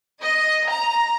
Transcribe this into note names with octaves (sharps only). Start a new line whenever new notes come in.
D#5
A#5